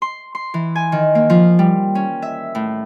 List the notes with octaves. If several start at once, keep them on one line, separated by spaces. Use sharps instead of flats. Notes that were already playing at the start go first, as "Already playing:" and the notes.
C6
C6
E3
G#5
D#3
A#3
F3
G3
C#4
E5
A2